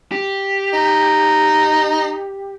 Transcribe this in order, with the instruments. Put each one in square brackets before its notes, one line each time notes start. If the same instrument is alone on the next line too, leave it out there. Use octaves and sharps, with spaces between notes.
[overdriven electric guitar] G4
[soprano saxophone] D#4